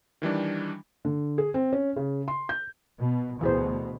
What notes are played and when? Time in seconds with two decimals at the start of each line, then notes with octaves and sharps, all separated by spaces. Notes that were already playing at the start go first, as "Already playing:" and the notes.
0.22 D#3 E3 G3 D4
1.05 D3
1.38 G#4
1.54 C4
1.73 C#4
1.96 C#3
2.28 C6
2.49 G6
3.01 B2
3.41 D2 B2 E3 G#4 C5